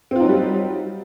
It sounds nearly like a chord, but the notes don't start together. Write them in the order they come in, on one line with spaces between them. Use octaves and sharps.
C4 F4 D#4 F#3 G3